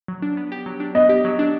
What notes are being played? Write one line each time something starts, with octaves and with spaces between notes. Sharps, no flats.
F#3
D4
B3
G4
F#3
D4
B3 D#5
G4
F#3
D4